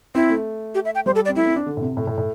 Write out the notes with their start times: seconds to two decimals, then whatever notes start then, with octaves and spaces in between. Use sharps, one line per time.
0.15 C4 E4
0.30 A3
0.75 G4
0.85 E5
0.95 G5
1.06 G3 C5
1.15 A4
1.25 D5
1.29 C4
1.36 A3 E4
1.46 C4
1.56 D4
1.66 D3
1.77 A2
1.81 C3
1.97 A2
2.07 A2
2.18 A2